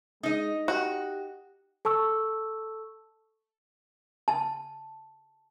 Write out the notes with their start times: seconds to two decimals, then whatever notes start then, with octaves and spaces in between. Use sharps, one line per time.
0.23 G#3 D#4 D#5
0.68 F#4 G4
1.85 A4 A5 C#6 E6
4.28 A5